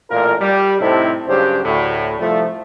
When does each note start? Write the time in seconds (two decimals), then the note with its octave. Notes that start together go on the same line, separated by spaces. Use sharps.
0.11 A1 A#2 A3 F4 A#4
0.41 G3
0.80 A2 C3 C4 D#4 E4 A4
1.28 G2 C#3 F#3 G4 C5
1.65 D2 A2
2.20 C2 F3 A3